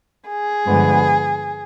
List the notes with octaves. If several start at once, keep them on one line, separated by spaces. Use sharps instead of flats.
G#4
G2 D3 F3 G#3 B3